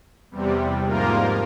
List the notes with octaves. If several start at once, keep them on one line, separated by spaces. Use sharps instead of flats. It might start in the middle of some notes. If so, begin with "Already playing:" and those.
E2 C3 G3
G#2 F3 A#3 F4 A#4